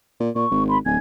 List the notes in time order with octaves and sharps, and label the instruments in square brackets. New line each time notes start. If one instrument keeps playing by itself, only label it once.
[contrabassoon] A#2
[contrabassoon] A#2 [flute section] C#6
[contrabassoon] G#1
[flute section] B5 C6
[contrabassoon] D1 [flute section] G#5 G#6